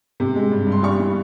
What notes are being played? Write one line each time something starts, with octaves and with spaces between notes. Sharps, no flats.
C3
G#3
G2
G2 C6
G3 C#6
E3